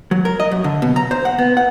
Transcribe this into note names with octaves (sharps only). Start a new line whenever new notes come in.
F#3
A#4
D#5
F#2
D3
B2
A#5
C5
F#5
B3
F#5